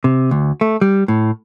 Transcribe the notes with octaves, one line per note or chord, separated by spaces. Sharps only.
C3
D2
A3
G3
A2